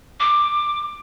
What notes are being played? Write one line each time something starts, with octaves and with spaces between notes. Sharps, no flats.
D6